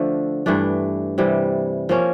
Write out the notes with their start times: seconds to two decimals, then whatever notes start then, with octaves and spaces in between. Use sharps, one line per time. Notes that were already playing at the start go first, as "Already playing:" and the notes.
Already playing: D3 F3 A3
0.46 G2 E3 A3 D4
1.18 C3 E3 G3
1.89 F3 A#3 C#4